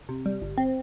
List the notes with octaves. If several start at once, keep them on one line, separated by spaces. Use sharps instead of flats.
C3
G3
G1
C4